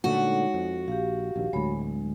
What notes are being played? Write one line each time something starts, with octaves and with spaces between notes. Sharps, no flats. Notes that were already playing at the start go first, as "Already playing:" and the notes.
A#2 D3 G#3 A3 D#4 F#4 C#5
F2
A#1 G4 F5
A#1 D#2
D1 D2 G#3 C#5 B5
G#3